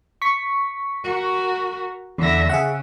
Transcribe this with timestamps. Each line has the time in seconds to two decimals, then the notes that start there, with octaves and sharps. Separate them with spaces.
0.22 C#6 B6
1.04 F#4 A#4
2.18 E2 D3 E5 A#6
2.49 C#3 G#4 E5 F#5